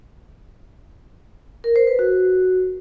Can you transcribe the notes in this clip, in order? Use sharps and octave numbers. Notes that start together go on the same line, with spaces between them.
A#4
C5
B4
F#4